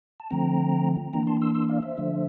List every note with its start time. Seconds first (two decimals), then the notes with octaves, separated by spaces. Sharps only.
0.20 A5
0.30 D3 F3 A3 C4 G5 A#5
1.13 E3 A#3 D4 G5 A#5
1.27 A5 C6
1.42 C6 E6
1.54 C6 E6
1.69 D5 F5
1.82 C5 E5
1.97 D3 F3 A3 D4